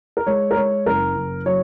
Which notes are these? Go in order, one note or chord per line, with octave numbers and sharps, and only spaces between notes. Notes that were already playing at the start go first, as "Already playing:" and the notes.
A#4
G#3 C#5
A#4
G#3 C#5
F#1 A#4
F#1
F#3 C#5